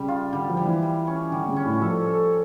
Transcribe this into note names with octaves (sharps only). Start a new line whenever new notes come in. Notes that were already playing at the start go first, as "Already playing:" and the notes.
Already playing: C#3 G3
F4
D3 G3
F3
G3
E3
G3
C#4
D3 G3
C#3
C#4
A2
F3 A4
A4